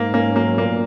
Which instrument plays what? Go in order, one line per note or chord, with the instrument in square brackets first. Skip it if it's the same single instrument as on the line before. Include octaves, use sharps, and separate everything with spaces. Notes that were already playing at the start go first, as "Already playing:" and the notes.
Already playing: [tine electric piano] G#2 [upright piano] A#3
[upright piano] A#3 [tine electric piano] C#4
[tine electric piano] F#3 [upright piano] A#3
[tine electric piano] A#2 [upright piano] A#3